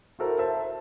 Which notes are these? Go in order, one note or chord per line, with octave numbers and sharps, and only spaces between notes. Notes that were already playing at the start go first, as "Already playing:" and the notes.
E4 F#4 A4 A#4 C5
C5 E5 A5